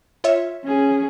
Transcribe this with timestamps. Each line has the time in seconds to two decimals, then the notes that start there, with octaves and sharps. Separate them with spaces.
0.24 F4 C#5 E5
0.64 C#4 G#4